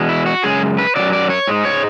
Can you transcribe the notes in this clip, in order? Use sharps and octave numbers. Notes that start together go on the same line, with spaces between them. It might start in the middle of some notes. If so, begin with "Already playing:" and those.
Already playing: E2 B2 G#3
E4
F#4
F#2 C#3 G#3 G#4
B4
F#2 C#3 F#3 D5
D5
C#5
G#2 G#3
C#5